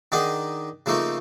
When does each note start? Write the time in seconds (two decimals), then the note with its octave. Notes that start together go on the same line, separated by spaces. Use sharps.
0.12 D#3 D4 D#4 G#4 F#5
0.86 C#3 F3 A3 A#3 D#4